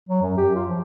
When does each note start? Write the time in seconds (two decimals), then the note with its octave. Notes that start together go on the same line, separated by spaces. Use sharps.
0.09 F#3
0.22 F#2
0.37 G4
0.55 F4
0.68 F3